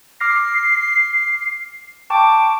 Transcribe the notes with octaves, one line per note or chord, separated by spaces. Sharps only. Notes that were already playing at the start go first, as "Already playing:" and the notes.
D6 F6 A#6 C7
G5 A5 C#6 D6